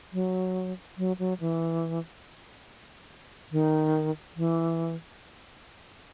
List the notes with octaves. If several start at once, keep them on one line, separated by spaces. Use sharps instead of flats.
F#3
F#3
F#3
E3
D#3
E3